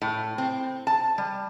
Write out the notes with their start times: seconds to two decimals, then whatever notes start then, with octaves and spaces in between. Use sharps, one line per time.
0.02 A2
0.38 C4
0.87 A5
1.18 G3